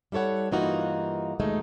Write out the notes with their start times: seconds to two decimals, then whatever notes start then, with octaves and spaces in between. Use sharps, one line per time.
0.12 G3 E4 A4 C#5 F#5
0.52 G2 E3 A#3 D#4 F4 F#4
1.40 D#2 B2 G#3 A3 D#4